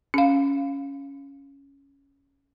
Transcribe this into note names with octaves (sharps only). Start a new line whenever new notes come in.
C#4 F5